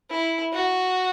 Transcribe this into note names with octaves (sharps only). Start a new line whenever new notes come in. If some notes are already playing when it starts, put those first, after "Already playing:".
E4
F#4